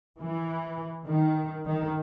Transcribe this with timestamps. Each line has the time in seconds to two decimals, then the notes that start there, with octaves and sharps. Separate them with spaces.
0.18 E3
1.06 D#3
1.65 D#3